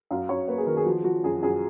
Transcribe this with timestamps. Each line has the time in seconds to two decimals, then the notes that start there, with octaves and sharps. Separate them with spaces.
0.11 F#2 F5
0.29 F#2 C#5
0.48 A#3 B4
0.58 G#4
0.66 D#3 A#4
0.77 G#4
0.86 F3 F#4
1.04 F3 F#4
1.24 F#2 G#4
1.43 F#2 G#4